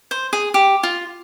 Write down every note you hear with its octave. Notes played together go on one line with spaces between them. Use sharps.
C5
G#4
G4
F4